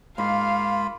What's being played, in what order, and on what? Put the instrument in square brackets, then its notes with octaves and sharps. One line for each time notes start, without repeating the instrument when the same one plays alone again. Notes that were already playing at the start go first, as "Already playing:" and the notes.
[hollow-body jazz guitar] G#2 [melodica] A#3 F4 B5 [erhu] F5